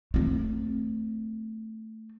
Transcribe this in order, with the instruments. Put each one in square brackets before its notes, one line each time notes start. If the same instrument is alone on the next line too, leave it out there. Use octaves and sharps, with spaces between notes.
[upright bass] A3 C4